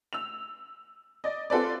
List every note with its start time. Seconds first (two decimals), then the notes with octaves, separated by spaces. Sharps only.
0.13 E6 F7
1.24 D5 D#5
1.50 C4 F4 A4 B4 D5